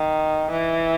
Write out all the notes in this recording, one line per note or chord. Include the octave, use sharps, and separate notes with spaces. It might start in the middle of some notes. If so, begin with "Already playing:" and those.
Already playing: D#3
E3